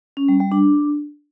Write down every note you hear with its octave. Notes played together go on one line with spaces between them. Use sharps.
C#4
G3
G3
D4